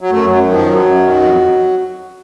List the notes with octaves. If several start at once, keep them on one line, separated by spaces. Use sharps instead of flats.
F#3
F#2 A3
F#2 F#3
D#3 F3
F#2 F#3
F#2
D#3
F2